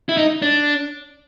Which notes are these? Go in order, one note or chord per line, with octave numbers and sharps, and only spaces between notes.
E4
D#4
D4